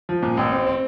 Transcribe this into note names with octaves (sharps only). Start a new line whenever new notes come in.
F3
A#2
A1
C4
C4